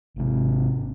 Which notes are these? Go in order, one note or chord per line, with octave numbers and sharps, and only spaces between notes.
G#1 C3